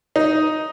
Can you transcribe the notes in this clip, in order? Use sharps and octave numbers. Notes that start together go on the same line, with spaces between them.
D#4